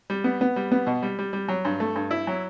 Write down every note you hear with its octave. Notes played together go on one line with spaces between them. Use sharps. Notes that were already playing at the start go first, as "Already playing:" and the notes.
G3
B3
B3
G3
B3
B2
G3
G3
G3
F#3
G2
A3
G2
E4
F#3